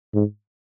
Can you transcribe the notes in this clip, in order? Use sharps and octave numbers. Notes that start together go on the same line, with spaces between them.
G#2